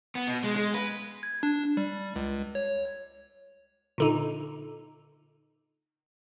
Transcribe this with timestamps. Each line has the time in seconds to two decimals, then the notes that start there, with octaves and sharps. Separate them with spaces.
0.15 B3
0.27 B2
0.44 G#3
0.56 G#3
0.74 B4
1.23 G#6
1.43 D4
1.77 G3
2.16 C#2
2.55 C#5
3.98 A#2 D3 D#4